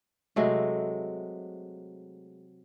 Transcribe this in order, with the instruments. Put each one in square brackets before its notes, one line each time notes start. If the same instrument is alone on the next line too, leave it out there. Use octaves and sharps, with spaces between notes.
[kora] C3 F#3 G#3 A3